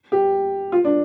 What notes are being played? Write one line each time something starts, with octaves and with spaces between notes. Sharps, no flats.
G4
F4
D4